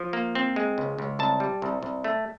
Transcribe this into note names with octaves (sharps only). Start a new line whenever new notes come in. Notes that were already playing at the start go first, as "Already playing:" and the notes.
Already playing: F3
A#3
C4
G#3
C#2
C#2
C2 A5
G3
C2
C2
A3